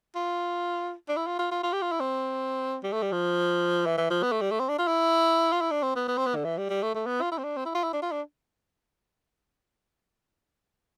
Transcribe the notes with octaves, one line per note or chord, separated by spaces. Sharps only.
F4
D4
E4
F4
F4
F4
F4
G4
F4
E4
C4
G3
A3
G3
F3
E3
E3
F3
B3
A3
G3
A3
C4
D4
F4
E4
F4
E4
D4
C4
B3
B3
C4
B3
D3
E3
G3
G3
A3
A3
B3
F4
E4
C4
D4
C4
E4
F4
E4
D4
F4
D4